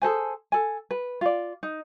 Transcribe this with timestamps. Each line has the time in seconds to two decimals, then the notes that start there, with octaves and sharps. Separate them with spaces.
0.02 G#4 A4 C5 G#5
0.52 A4 G#5
0.91 B4
1.21 F4 D5
1.63 D#4